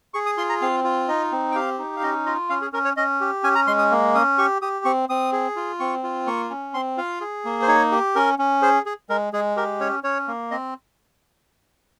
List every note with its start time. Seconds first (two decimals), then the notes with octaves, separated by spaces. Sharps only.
0.14 G#4 C#6
0.26 D#6
0.38 F4 C6
0.49 A#5
0.61 C4 F5
0.84 F4
1.08 D#4 D#5
1.32 C4
1.52 G5
1.56 G4 F5
1.79 D#4
1.97 F5
2.03 C#4 D#5
2.26 F4 D#5
2.50 C#4 F5
2.62 G#4
2.73 C#4 A#4
2.85 C#5
2.97 C#4 D#5
3.21 G4
3.44 C#4 G#5
3.55 A#5
3.67 G#3 C6
3.79 D#6
3.91 A#3
4.15 C#4 D#6
4.38 G4 C#6
4.62 G4 D#6
4.85 C4 C#6
5.09 C4 D#6
5.33 G#4
5.56 F4
5.80 C4 C#6
6.03 F4
6.26 A#3 C#6
6.50 C#4
6.74 C4 C6
6.97 F4 F5
7.21 G#4
7.45 A#3
7.62 C5
7.68 D#4 C#5
7.92 G4
8.16 C#4 A#4
8.39 C#4
8.62 G#4 C5
8.86 G#4
9.10 G#3 A#4
9.33 G#3 G#4
9.57 G4 A#4
9.80 C#4 C#5
10.04 C#4 C#5
10.28 A#3
10.51 C4 D#5